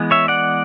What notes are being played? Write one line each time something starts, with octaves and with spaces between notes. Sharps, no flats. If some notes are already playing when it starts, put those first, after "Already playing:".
Already playing: E3 G#3 B3
C#5 E5
D5 F#5